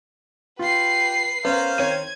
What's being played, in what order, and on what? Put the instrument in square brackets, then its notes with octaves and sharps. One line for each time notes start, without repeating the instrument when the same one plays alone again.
[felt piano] F4 [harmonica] G4 [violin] B4 C7
[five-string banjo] B3 [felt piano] C#4 [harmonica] A#4 C5 F5
[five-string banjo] D#3 C4 C#5 [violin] G#6 [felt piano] D#7